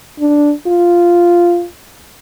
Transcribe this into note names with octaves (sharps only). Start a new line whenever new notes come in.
D4
F4